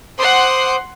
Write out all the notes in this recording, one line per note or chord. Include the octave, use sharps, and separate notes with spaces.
C5 F#5 C6 D6 D#6